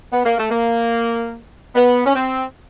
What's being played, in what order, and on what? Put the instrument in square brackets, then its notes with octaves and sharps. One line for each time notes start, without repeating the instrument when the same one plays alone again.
[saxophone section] B3
A#3
A3
A#3
B3
C#4
C4